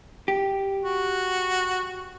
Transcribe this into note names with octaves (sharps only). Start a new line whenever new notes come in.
G4
F#4